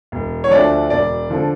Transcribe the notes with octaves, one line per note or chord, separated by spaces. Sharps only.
E1
C#5
D2 D3 F3 D5
E1 D5
D3 F3